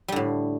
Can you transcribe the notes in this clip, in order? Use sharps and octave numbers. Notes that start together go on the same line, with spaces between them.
A2 D3 G3